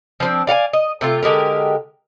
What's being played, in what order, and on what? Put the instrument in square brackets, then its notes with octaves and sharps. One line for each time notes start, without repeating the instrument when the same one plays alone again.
[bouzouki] F3 C4 D4
D5 F5 F#5 G#5
D#5
C3 A3 F4
D3 G#3 G4 A#4